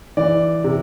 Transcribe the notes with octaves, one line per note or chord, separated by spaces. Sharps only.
E3 D5
C3